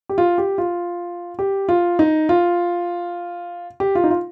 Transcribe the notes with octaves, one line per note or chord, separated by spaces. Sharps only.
G4
F4
G4
F4
G4
F4
D#4
F4
G4
F4
D#4
F4